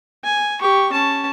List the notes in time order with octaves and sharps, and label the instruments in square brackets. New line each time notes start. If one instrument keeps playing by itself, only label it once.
[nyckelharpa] G#5
G4 C#6
C#4 A5